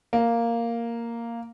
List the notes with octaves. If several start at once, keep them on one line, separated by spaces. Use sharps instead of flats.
A#3